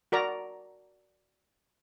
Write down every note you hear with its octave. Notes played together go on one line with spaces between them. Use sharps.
F#4 A#4 D5 A#5